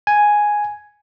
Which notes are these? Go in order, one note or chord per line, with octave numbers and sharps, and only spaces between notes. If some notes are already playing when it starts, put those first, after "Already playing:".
G#5